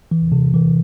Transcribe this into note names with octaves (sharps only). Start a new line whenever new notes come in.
E3
C3
E3